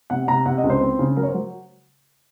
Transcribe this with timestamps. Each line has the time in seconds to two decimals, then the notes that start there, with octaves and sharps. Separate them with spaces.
0.10 C3 F#5
0.28 C3 A#5
0.46 C3 F#5
0.58 D#5
0.64 C#2
0.70 C5
0.81 C4
0.99 C#3
1.17 F#3 A#4
1.23 C#5
1.28 C5
1.34 F#3